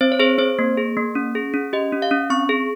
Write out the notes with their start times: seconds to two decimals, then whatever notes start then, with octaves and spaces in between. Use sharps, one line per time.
0.01 C4 C5
0.12 C#5
0.19 G#4 C5
0.38 C4 C5
0.59 A#3
0.78 G#4
0.97 A#3
1.15 C#4
1.35 G#4
1.54 C#4
1.73 G4 D#5
1.93 C#4
2.02 F5
2.11 C#4
2.30 C4 C#6
2.49 G#4